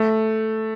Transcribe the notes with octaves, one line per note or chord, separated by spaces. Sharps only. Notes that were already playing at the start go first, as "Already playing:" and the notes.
Already playing: A3